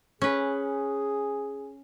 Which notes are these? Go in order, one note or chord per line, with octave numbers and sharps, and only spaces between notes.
C#4 G#4 B4